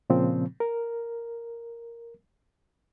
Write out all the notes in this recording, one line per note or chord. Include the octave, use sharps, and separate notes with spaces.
A#2 C#3 F3 C4
A#4